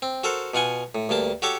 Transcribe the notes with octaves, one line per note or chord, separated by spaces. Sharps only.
C4
F#4 A4 A#4 C5
B2 F4 F#5 G#5
A2
D2 G2 A#3 A5
F#4 G4 A4 C#5 D6